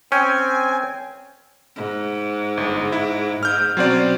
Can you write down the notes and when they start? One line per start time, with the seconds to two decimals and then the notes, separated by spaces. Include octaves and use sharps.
0.12 C4 C#4 G5 G#5
1.76 G#2
2.57 G1
2.92 E4
3.43 G#2 F6 G6
3.77 B2 F#3 C4 C#4 D5